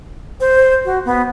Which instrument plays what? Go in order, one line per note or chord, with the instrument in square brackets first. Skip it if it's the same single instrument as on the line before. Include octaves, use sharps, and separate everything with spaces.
[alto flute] C5
F#4
B3